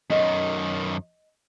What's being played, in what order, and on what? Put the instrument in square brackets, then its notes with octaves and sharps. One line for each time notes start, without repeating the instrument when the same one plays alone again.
[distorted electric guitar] F#2 D#3 [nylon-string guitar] D#5